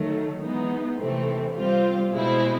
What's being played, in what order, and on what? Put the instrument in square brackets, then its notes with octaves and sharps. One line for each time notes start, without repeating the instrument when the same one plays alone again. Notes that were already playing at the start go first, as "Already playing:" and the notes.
Already playing: [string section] D#3 F#3 A3
E3 G#3 B3 D#4
C3 E3 A3 C4
G3 C4 F4
B2 G#3 C4 E4